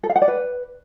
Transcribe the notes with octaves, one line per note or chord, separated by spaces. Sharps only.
A4
F5
F#5
D5
B4